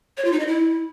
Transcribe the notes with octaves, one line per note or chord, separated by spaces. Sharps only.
C#5
F4
D#4
D#5
E4